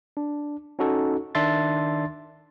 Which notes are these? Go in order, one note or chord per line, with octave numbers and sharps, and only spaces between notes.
D4
C#4 D#4 F#4 A4
D#3 D4 E5 C6 A6